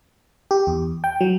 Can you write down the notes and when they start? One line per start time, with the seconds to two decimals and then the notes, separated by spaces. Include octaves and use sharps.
0.51 G4
0.67 E2
1.04 G5
1.21 F#3